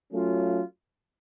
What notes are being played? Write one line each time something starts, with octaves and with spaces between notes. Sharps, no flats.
F#3 A3 C#4 F4